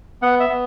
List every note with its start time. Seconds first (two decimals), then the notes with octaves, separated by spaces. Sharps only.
0.22 B3 F#5
0.40 E5
0.49 B3